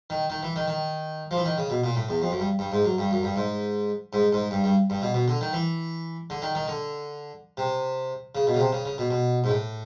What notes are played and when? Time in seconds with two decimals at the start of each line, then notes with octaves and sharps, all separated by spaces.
0.10 D#3
0.30 D#3
0.43 E3
0.56 D#3
0.68 D#3
1.31 F3
1.37 E3
1.45 D#3
1.58 C#3
1.70 B2
1.84 A#2
1.95 A2
2.09 E2
2.22 F2
2.31 F#2
2.40 G2
2.59 G2
2.72 G#2
2.85 F#2
2.98 G2
3.11 F#2
3.23 G2
3.36 G#2
4.13 G#2
4.33 G#2
4.51 G2
4.64 G2
4.90 G2
5.02 B2
5.14 B2
5.28 D3
5.41 D#3
5.53 E3
6.30 D3
6.42 D#3
6.55 D#3
6.68 D3
7.57 C3
8.35 C#3
8.47 B2
8.54 C#3
8.59 C3
8.73 C#3
8.85 C#3
8.98 B2
9.10 B2
9.44 G#2
9.49 A2